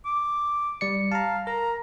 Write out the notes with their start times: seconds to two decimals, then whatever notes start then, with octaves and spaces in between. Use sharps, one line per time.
0.05 D6
0.81 G3 D5 C#7
1.12 F5 A5 A#5
1.47 A#4 A#5